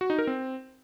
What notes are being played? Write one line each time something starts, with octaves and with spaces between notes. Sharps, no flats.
F#4
D#4
A#4
C4